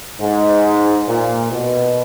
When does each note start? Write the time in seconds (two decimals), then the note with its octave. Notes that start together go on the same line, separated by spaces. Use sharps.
0.21 G#2
1.08 A#2
1.52 B2